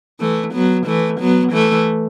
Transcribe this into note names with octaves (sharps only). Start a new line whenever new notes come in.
E3 A3
F#3 B3
E3 A3
F#3 B3
E3 A3